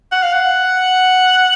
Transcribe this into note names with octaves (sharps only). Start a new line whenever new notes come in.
F#5
F5
F#5